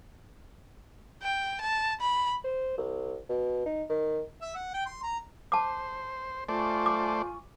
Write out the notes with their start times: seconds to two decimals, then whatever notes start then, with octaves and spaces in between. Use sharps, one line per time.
1.23 G5
1.61 A5
2.01 B5
2.44 C5
2.78 C2
3.29 B2
3.66 D#4
3.90 D#3
4.42 E5
4.55 F#5
4.74 G5
4.86 C6
5.03 A#5
5.52 C5 A5 D6
6.49 A3 F4 C5 D5 G#5 C#6
6.86 D6